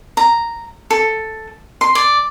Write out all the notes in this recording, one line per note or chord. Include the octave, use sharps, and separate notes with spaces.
A#5
A4
C6
D5